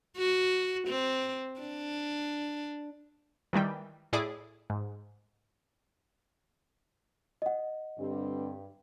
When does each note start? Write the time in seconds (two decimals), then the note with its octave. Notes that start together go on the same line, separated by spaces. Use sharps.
0.18 F#4
0.88 C4
1.60 D4
3.53 D#3 E3 G3 G5
4.13 A2 E4 G#4 D5 D6
4.70 G#2
7.42 D#5 F#5
7.99 G2 D3 G3 C4